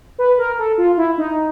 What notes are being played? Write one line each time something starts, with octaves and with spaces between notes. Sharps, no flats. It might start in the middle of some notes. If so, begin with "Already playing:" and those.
B4
A#4
A4
F4
E4
D#4